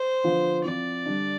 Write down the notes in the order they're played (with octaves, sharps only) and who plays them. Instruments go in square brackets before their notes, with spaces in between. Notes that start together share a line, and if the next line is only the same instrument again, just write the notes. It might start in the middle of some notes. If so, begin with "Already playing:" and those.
Already playing: [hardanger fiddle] C5
[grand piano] D3 F3 B3
[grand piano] F3 C4 E4 [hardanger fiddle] D5
[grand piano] D3 G3 D4